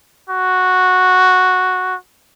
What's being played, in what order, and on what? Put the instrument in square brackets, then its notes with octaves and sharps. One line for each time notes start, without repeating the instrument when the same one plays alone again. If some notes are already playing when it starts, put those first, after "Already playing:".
[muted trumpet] F#4